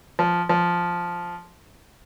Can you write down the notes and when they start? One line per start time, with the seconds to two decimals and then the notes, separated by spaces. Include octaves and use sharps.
0.19 F3
0.49 F3